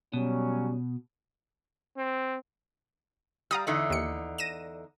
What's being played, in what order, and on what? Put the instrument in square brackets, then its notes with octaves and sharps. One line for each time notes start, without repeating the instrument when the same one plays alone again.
[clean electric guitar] B2 [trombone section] F#3 G3 C#4
[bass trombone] C4
[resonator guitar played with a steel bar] G3 [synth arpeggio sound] F5 A#5 D#6
[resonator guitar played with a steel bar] E2 D3 D#4
[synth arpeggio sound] D#2 C#7
A#6 D#7 E7